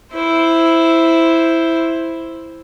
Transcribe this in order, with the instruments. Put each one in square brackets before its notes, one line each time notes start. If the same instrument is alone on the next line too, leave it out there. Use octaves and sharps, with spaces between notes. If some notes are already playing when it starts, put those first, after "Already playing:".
[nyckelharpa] E4 C5